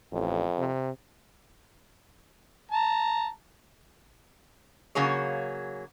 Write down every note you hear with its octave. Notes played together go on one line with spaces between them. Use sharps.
A1 F2
C3
A5 A#5
C#3 F#3 A#3 G#4 C#5